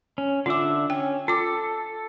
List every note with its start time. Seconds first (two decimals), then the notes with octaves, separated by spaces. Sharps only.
0.18 C#4
0.46 D3 D4 F4 E5 D6
0.90 C#4 G5
1.28 F4 A4 D6